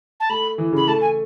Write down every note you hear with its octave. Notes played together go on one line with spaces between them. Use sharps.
A5
A3 B5
E3
C#3 B5
A3 A5
G#5